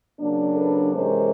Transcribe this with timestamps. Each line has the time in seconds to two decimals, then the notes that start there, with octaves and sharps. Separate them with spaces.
0.19 C#3 F#3 A#3 D4
0.57 A4 B4
0.94 C3 E3 G#3 C#4 A#4 C5